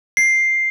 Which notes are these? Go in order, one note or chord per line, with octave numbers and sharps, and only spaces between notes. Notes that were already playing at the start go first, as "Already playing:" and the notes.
C7